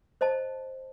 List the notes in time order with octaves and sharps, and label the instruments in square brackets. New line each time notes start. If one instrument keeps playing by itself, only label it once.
[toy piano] C5 D#5 A5